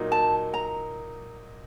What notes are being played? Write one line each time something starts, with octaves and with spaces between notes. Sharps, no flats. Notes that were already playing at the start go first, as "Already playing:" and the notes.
Already playing: A#2 F#3 A#3 D#4
A5
A#5